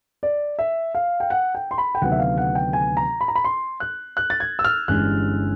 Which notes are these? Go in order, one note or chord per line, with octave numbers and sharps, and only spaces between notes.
D5
E5
F5
G5
F#5
G5
C6
B5
G5
D2 C3 D#3 F#3 B3 F#5
E5
F5
F#5
G5
G#5
A#5
B5
A#5
B5
C6
F#6
F#6
A6
G#6
E6
F6
G1 G2 E3 G#3 C#4 F#6